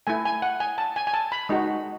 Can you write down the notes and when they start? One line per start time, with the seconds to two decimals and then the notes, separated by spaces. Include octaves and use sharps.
0.07 A3 E4 G#5
0.25 G#5
0.42 F#5
0.60 G#5
0.78 A5
0.96 G#5
1.07 G#5
1.14 A5
1.32 B5
1.49 G#3 D#4 F#4